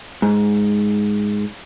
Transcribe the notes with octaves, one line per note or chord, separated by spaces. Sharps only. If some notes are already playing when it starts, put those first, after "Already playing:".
G#2